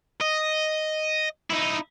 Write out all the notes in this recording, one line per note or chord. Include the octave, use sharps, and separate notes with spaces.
D#5
D#4 E4